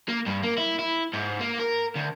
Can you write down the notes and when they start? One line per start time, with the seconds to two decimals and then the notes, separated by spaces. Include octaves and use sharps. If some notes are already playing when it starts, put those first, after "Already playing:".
0.09 A#3
0.27 G2
0.43 A#3
0.58 E4
0.79 E4
1.14 G#2
1.41 A#3
1.60 A#4
1.96 D2